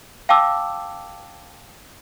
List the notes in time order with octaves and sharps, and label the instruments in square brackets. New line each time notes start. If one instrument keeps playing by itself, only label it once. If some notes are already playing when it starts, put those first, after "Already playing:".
[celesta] F5 G5 A5 D6 E6